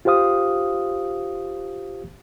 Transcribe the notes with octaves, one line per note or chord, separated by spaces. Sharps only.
F4 G4 C5 F5 D#6